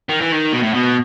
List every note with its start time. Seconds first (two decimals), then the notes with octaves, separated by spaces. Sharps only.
0.09 D#3
0.21 E3
0.32 D#3
0.52 B2
0.62 A2
0.73 B2